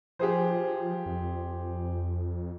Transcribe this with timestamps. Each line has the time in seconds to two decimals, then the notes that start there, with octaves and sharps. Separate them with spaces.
0.19 F3 G4 G#4 C5
1.06 F2